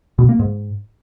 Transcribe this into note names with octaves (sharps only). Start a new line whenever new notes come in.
B2
A#3
G#2